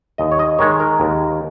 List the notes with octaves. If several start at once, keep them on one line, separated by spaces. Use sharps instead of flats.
D#2 D#5
C#5
D#5
D#3 G#3 C#5
A#4
D#2